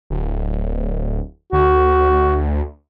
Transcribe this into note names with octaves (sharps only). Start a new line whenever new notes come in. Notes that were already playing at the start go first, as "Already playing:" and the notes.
D1
D2 F#4